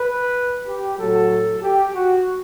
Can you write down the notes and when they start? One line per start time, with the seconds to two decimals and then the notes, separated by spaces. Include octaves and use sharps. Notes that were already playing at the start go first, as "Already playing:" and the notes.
Already playing: B4
0.68 G4
0.99 A2 F#3 A4
1.63 G4
1.95 F#4